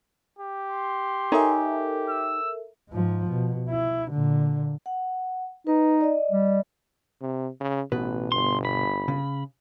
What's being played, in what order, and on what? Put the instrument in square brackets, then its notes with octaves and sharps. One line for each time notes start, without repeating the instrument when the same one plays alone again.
[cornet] G4
[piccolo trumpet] C6
[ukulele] D#4 C#5 G#5 [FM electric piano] A4 A#4 E5
[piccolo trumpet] E6
[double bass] G#2 F3
B2
E4
A#2 D3
[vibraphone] F#5
[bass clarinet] D#4 [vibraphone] B4
[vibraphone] D5 D#5
[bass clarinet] G3
[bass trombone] C3
C#3
[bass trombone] A1 [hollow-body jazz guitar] B2 B4
[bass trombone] G1 [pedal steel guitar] C6
[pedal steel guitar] B5
[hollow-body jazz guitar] C#3